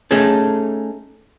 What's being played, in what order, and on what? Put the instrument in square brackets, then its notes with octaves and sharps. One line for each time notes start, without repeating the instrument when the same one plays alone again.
[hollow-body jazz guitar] A3 C#4 D#4 G#4 A4